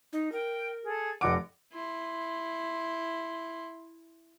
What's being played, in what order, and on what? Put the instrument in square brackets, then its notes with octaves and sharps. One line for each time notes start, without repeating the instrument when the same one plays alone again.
[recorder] D#4
[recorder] A#4 [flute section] G5
[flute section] G#4 A4
[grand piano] F1 D6 [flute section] D#5 G5 [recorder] F#5
[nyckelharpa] E4 C6